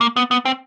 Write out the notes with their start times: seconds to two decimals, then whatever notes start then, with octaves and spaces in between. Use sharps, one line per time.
0.01 A#3
0.16 B3
0.31 B3
0.45 C4